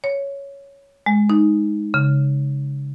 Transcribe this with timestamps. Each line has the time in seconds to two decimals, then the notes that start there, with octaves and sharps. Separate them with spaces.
0.04 C#5
1.06 G#3
1.30 D#4
1.94 C#3